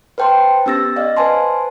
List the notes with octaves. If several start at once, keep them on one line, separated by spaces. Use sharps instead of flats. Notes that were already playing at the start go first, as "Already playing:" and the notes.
B4 C5 G5 A5 C6
B3 C#4 G4 E6 A6 A#6
D5 D#5 F5
B4 C5 G#5 A5 C6